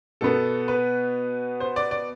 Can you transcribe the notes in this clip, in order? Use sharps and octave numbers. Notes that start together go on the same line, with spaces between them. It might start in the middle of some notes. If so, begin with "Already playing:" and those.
B2 B3 A4
B4
C5
D5
D5